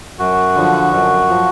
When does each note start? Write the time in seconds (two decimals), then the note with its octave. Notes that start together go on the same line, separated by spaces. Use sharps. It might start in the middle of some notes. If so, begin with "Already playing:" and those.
0.19 F#2 F#4
0.55 D3 F3
0.93 F#2
1.30 F3